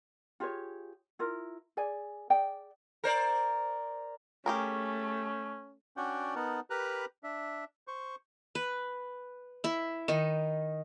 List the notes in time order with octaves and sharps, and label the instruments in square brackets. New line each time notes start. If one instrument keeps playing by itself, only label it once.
[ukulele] F4 G4 G#4 C#5
E4 F4 A#4
G#4 D5 G#5
G#4 D5 G5
[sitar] A#4 C5 D5
[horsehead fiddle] A3 [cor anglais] C#4 [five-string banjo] G4 G#4 A#4
[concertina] C#4 D4 F#4 D5 F#5 G5
B3 D#4 A#4 F#5 A5
G4 A#4 B4 A#5 B5 F#6
D4 E5
C5 C#6
[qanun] B4
E4 E5
D#3 D#4